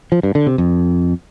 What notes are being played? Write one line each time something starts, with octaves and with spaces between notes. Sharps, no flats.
F3
G2
D3
C3
F2